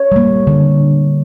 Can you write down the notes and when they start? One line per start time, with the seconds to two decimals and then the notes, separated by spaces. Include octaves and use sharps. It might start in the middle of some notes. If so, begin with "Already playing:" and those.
Already playing: C#5
0.12 G3 A#3
0.47 D3